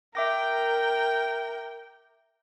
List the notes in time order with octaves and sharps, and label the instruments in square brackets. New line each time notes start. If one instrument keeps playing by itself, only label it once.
[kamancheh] A#4 G5 [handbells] E5 D6 A#6